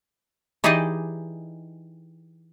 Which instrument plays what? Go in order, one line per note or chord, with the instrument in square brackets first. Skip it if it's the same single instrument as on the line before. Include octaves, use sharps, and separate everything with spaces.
[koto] E3 D#4 G4 G#4 D5 D#5